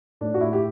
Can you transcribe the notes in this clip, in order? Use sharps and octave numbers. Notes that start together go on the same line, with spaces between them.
A2 D4
F#4
A2 E4
G4